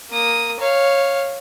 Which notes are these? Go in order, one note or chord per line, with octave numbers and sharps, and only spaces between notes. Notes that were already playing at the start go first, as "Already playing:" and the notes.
A#3 D#6
C#5 F5